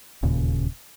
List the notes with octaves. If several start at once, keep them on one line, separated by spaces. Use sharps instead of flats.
E1 D#2 A#2 C#3